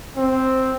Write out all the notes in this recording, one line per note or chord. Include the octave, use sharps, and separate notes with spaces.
C4